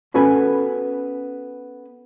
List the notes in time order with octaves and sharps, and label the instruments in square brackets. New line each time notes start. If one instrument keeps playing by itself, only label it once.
[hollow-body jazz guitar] B3 C#4 F#4 A4 B4 G#5